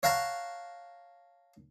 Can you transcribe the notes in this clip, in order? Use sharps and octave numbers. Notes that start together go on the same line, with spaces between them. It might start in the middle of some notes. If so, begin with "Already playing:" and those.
C#5 F5 F#5 A5 A#5